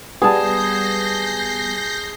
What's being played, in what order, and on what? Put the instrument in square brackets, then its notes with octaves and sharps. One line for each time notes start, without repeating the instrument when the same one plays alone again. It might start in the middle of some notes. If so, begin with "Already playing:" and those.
[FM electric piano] G3 B3 [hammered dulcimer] G#4 A5 [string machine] G6 A#6 C7